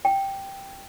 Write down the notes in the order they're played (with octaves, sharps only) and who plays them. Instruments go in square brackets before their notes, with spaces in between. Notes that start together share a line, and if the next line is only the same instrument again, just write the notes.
[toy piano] G5